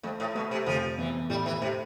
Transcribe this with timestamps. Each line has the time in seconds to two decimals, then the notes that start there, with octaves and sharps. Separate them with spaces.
0.03 F2 A3
0.20 A2
0.35 B2 A3
0.51 C3
0.66 F1 F3
0.98 E2 E3
1.30 A2 G3
1.46 E3
1.61 A2 C3